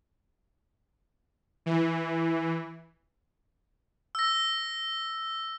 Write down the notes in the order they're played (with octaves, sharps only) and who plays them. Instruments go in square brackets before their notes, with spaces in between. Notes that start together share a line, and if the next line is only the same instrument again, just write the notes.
[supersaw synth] E3
[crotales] E6 A#6